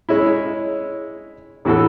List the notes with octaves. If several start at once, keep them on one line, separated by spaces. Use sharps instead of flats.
G#3 C#4 E4
A2 E3 B3 F#4 A4